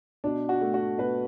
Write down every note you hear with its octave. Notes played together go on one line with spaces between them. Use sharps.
B2 D4
F#4
A3
F#4
B2 B4